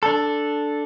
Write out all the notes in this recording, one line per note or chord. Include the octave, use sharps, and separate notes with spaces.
D4 A4